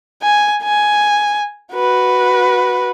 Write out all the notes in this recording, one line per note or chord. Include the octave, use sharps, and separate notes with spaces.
G#5
G#5
F#4 B4